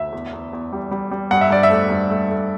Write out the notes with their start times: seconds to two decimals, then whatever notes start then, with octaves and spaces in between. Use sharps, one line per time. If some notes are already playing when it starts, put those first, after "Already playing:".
Already playing: D2 E5
0.12 E2
0.33 E2
0.53 E2
0.72 G3
0.91 G3
1.11 G3
1.31 G2 F#5
1.41 E5
1.50 G2 D5
1.63 E5
1.70 A3
1.90 G2
2.10 A3
2.30 A3